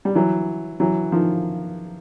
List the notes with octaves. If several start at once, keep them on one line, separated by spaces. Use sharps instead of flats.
G3
E3 F#3
E3 F#3
D#3 F3